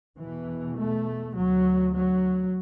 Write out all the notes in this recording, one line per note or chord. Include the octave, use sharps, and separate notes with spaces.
E2 B2 E3
A3
D2 F#3
F#3